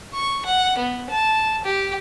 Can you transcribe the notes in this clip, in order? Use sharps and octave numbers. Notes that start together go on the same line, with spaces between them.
C#6
F#5
B3
A5
G4